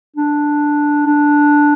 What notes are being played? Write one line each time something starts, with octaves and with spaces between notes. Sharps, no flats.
D4
D4